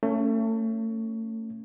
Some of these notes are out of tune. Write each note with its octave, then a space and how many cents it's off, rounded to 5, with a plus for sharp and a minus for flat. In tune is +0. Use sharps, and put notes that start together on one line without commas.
A3 +30 C#4 +0